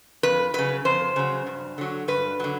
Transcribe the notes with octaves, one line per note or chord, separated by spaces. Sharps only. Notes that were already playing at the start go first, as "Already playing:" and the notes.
F2 B4
C#3 F#3 B4
F2 C5
C#3 F#3
G2
D3 F#3
G2 B4
D3 F#3